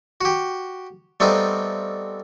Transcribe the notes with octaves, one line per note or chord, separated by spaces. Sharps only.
F#4 G4
G3 A3 B3 C4 D#4